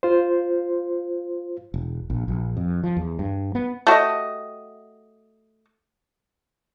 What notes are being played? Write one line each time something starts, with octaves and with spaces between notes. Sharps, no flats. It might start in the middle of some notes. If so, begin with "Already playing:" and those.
F4 C5
E1
A#1
A#1
F2
F3
E2
G2
B3
A3 F#4 G4 D#5